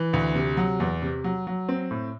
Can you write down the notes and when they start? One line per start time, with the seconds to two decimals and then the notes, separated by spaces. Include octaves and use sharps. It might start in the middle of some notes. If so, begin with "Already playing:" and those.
Already playing: E3
0.13 D2
0.35 C3
0.57 F#3
0.80 E2
1.02 C3
1.24 F#3
1.47 F#3
1.69 C4
1.91 A2